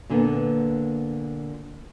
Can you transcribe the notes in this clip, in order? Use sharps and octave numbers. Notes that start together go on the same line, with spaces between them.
A#2 D3 A#3 B3